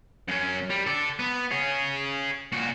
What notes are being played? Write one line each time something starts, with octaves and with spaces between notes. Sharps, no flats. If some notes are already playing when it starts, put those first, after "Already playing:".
F#2 C#4
G3
A4 D5
B3
G#4 C#5
A#2 F#4